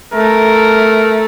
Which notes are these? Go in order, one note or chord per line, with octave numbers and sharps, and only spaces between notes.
A3 A#4